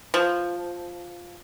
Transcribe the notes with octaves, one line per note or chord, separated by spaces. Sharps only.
F3